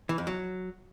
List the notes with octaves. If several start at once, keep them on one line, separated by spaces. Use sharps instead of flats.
E3
F2
F#3